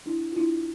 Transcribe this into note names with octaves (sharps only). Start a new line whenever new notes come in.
D4 E4
F4
D4 E4